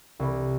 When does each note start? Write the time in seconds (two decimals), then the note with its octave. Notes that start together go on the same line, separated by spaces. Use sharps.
0.19 C2